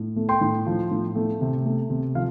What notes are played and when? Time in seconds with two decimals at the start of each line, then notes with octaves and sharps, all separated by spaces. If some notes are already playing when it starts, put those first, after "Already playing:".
Already playing: A2
0.16 A3
0.29 G5 C6
0.41 A2
0.67 F3
0.91 A2
1.15 A3
1.41 C3
1.66 A3
1.90 C3
2.15 F3 F5